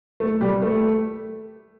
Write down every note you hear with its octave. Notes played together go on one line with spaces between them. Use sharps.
A3
G3
A3